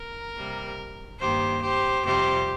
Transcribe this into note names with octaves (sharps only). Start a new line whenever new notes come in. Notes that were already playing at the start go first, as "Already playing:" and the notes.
Already playing: A#4
C3 G3 A#3
G2 D#3 A#3 G4 C5
G4 C5
F2 C3 G3 G4 C5